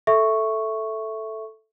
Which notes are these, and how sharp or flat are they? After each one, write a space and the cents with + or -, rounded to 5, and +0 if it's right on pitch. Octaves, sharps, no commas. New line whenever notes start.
A4 +0 E5 +0 C#6 +0